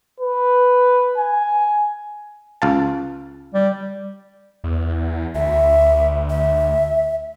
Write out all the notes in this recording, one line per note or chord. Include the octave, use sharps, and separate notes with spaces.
B4
G#5
C#2 F5 A5
G3
E2
D2 E5
E5